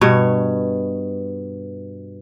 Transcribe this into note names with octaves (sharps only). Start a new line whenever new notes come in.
G2 B2 C#5